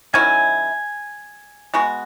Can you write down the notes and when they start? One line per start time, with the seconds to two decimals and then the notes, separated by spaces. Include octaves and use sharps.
0.14 D#3 F#3 C#4 E4 G#5
1.74 G#3 B3 F#4